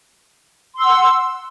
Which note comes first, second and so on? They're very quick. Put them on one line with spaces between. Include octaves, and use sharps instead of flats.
C6 E6 F#5